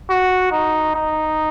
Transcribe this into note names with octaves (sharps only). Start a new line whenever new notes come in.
F#4
D#4
D#4